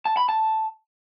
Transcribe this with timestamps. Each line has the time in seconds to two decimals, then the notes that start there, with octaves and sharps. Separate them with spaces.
0.05 A5
0.17 B5
0.29 A5